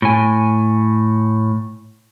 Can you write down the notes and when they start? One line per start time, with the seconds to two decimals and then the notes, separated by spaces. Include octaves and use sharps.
0.02 A2 G#5